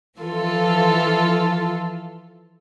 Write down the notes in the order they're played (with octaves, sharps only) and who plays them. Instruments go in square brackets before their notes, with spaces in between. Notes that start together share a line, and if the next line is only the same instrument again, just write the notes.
[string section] E3 F3 F4 A4